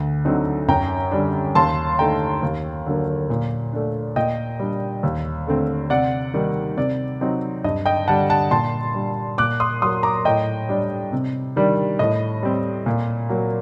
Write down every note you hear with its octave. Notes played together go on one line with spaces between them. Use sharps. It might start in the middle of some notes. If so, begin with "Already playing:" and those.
Already playing: D2
D3 F#3 C4 D#4
F#2 G5 A#5
D3 G3 D4
D#2 A5 C6
D3 A3 D#4 G5 A#5
D#2
D3 F#3 A#3
A#2
A3 D4
A#2 D#5 G5
G3 D4
D#2
D3 A3 C4
C3 D5 F#5
D#3 G3 A#3 D#4
C3 D5
F#3 C4 D#4
G2 D#5
D#5 G5
D3 G3 D4 F#5 A5
F#5 A5
A#2 A5 C6
G3 D4
A#2 D6 F#6
C6 D#6
F#3 A#3 C6 D#6
A#5 D6
A2 D#5 G5
G3 D4
C3
D#3 G3 D4
A2 D#5
G3 C4
A#2
F#3 A#3